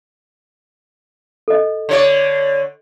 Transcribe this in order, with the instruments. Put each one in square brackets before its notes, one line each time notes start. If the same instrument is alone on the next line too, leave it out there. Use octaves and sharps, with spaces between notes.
[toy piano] A4 D#5
[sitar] D3 C#5 D5